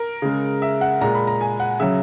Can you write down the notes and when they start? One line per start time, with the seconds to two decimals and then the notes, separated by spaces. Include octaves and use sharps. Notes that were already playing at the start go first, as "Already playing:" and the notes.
Already playing: A#4
0.22 C#3 G#3
0.62 E5
0.81 F#5
1.01 A#2 G#3 A#5
1.15 B5
1.27 A#5
1.41 G#5
1.60 F#5
1.80 C#3 F#3 E5